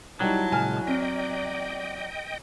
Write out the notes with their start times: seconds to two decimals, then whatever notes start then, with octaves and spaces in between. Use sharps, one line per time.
0.20 F#3 G3 D#4 E4 A5
0.52 A#2 C#3 G#3 G#5 F6
0.87 C4 D5 D#5 G5